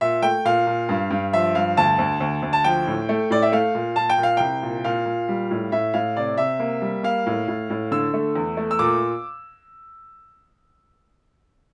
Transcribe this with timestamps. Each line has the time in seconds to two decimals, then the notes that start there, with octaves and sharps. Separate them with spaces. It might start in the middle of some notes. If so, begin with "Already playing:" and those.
0.01 A#2 E5
0.22 A3 G5
0.45 A#2 F5
0.67 A#2
0.89 G2
1.10 G2
1.33 F3 E5
1.55 G2 F5
1.77 D2 A5
1.98 D2
2.20 D2
2.42 D2
2.53 A5
2.64 F3 G5
2.87 A2
3.09 A3
3.30 A2 D5
3.42 E5
3.52 A3 F5
3.75 A#2
3.96 A#2 A5
4.10 G5
4.18 A#2
4.23 F5
4.37 C2 G5
4.62 A#2
4.84 A#2 F5
5.06 A#2
5.29 G3
5.51 A2
5.72 A2 E5
5.94 A2 F5
6.16 C3 D5
6.37 C3 E5
6.59 A#3
6.81 G3
7.03 A#3 F5
7.27 A2
7.48 A2
7.70 A2
7.91 D3 E6
8.14 A3
8.35 E2
8.57 A3
8.71 E6
8.79 A#2 D6